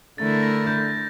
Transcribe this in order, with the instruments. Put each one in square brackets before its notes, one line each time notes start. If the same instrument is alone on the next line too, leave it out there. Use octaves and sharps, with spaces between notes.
[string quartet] D3 A3 E4 A#4 [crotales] A6
[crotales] A#6
G6